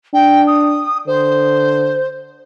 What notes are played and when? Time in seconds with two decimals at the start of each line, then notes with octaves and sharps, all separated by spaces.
0.13 D4 G5
0.47 D#6
1.06 D3 C5